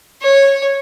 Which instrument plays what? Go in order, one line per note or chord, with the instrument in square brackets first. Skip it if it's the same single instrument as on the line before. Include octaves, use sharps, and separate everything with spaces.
[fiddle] C#5